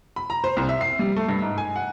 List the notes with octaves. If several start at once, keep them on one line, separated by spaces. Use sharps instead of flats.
B5
A#5
C5
C2
E5
C7
G3
A3
G2
G#2
G#5
F#5